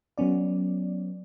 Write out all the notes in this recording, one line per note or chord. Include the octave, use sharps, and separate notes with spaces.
F#3 B3 C#4 D5